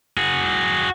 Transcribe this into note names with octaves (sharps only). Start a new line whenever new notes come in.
F#4 G#4